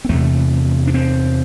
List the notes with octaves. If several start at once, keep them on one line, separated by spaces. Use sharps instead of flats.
C4
E2 C3 A3
D4
C4